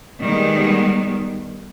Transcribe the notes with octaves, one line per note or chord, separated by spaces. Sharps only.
D#3 G3 G#3 B3